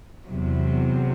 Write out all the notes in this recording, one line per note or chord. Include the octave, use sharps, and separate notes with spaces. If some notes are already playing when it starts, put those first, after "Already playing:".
E2 C3 F#3